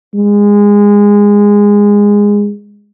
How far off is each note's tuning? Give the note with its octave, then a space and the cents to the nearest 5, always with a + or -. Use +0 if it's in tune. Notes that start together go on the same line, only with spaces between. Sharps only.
G#3 -20